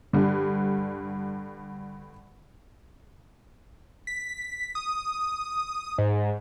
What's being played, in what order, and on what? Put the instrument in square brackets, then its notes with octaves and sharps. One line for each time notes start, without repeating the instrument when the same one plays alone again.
[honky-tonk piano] G2 D3
[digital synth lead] B6
D#6
G#2